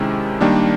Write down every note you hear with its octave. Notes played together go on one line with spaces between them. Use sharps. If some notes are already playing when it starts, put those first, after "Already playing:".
Already playing: C3 D#3 G#3 C#4 E4
D#3 G3 A#3 D4